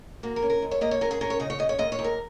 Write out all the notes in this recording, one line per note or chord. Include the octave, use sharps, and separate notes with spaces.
A#3 F#4
A#4
C#4
A#4
D#2
C#5
A#3 D#5
C#5
C#4 A#4
G#4
C#4 A#4
C#5
C#3 D#5
C#5
C#4 D#5
C#5
D#2 D#5
C#5
D#2
A#4